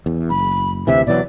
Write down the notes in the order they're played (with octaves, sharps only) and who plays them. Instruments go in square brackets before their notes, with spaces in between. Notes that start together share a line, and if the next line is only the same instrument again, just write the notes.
[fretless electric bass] E2
[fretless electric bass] F#1 [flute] B5
[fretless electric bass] D2 C3 E3 [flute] E5
[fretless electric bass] B2 E3 F#3 [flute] D5